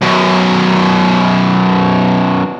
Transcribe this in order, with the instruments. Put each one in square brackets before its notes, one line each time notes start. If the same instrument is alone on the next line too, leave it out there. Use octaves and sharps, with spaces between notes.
[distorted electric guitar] F#2 B2